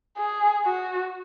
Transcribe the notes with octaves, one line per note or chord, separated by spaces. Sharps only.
G#4
F#4